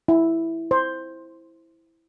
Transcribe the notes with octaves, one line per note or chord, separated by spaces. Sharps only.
E4
C5